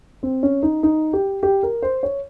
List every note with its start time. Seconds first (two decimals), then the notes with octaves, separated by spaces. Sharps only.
0.23 C4
0.43 C#4
0.63 D#4
0.83 D#4
1.13 G4
1.43 G4
1.63 A#4
1.82 C5
2.03 C#5